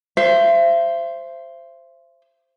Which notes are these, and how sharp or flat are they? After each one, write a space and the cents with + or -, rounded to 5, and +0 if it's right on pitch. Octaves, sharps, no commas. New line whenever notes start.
C5 +0 E5 +40